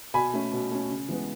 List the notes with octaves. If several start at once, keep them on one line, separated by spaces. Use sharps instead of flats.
B2 G#5 B5
A3 C#4
B2
A3 C#4
C#3
E3 G#3 B3